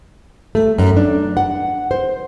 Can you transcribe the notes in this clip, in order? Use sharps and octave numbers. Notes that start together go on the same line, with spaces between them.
A3
F#2
D4
F#5
C5